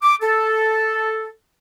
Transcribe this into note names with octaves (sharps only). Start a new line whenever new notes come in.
D6
A4